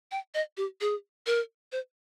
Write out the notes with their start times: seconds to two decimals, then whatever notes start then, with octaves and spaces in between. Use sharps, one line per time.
0.11 G5
0.34 D#5
0.57 G4
0.81 G#4
1.26 A#4
1.72 C5